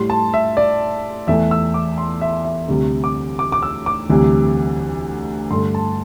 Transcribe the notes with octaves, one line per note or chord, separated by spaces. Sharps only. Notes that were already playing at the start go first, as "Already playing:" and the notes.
Already playing: A2 G3 C6
A5
E5
D5
E2 E3 A3 E5
E6
D6
C6
E5
E5
D2 C3 G3
D6
D6
D6
E6
D6
D2 C3 E3 G3
G2 D3 A3 C6
A5